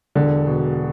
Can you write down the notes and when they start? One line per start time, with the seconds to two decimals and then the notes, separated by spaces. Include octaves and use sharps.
0.15 E1 D3
0.47 B2